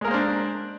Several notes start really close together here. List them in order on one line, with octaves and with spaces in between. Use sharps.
G#3 A#4 A#3 C5 D4